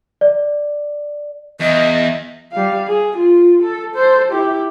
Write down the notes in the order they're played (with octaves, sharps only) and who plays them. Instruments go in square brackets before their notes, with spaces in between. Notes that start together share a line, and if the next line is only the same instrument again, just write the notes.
[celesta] D5
[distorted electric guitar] E2 [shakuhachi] D#5
[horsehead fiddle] G3 F5
G#4
F4
A4
A4 C5
E4 G4